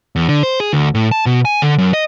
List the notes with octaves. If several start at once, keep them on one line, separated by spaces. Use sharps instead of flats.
E2
D3
C5
G#4
D2
A2
A5
B2
G#5
D3
F#2
D#5